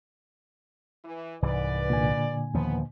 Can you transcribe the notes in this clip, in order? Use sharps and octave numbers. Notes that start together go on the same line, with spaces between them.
E3
C2 G#2 E3 B4 D5
A#2 D3 G#5
D#2 F3 B3